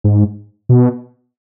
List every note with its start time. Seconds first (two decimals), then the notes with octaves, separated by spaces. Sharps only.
0.04 G#2
0.69 B2